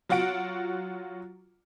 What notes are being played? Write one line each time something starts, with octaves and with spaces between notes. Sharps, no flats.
F#3 F4 F#4 F#5 D7